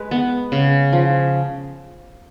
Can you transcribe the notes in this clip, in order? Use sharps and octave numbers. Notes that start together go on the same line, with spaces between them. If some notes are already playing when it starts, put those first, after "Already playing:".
Already playing: G#3 B4
B3
C#3
F3